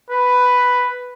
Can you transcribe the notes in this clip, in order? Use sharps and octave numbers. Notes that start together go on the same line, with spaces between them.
B4